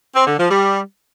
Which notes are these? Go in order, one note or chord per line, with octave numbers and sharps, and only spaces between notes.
C4
D3
F3
G3